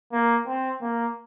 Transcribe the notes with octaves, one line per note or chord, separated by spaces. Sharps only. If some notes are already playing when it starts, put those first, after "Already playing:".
A#3
C4
A#3